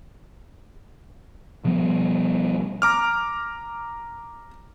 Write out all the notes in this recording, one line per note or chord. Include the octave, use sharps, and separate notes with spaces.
B2 F3 G3 B3
A#5 D6 F6